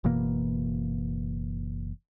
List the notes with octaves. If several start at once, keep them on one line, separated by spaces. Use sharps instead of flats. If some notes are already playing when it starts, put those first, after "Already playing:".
F#1 B2 E3 A#3